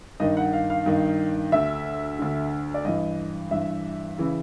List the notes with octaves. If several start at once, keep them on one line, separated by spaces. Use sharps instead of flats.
G2 D#3 D#5
F#5
F5
F5
G2 D#3
D2 D3 E5
D2 D3
D5
G2 E3 D#5
G2 E3 E5
C#3 E3